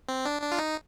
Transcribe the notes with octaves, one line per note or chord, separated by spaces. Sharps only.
C4
D4
D4
F4
D#4